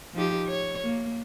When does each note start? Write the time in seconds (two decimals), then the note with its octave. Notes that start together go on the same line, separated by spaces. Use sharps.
0.14 F3 D#4 G4
0.47 C#5
0.83 A#3